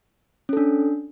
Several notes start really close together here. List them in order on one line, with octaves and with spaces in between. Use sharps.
C#4 A4 D4